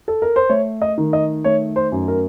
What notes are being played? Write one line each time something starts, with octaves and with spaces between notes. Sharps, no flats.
A4
A#4
C5
A3 C#5
D#5
D#3
D#5
A3 C#5
C5
F#2
A#4